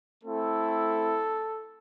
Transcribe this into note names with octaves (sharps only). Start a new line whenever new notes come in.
A3 C4 E4 A4